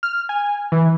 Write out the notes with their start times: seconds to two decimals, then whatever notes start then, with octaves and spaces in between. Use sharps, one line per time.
0.03 F6
0.29 G#5
0.72 E3